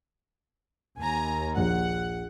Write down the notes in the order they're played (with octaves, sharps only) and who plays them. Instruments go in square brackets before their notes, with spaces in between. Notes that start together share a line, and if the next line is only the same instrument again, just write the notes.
[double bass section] D#2 [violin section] G#5 A#5
[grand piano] A#1 [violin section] F#5